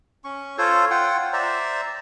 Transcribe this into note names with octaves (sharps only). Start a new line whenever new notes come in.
C#4 C#6
F4 A4 C5 C#5
F4 F#5 G5
C5 D5 E5 A#5